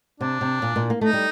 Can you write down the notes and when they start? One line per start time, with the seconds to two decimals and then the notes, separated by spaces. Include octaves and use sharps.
0.20 C3 D4
0.41 C3
0.62 A#2
0.76 A#2
0.90 A#3
1.01 A3 D#4
1.13 G3